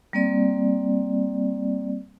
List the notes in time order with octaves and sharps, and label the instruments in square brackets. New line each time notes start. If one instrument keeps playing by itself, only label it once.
[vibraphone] G3 A#3 C4 D5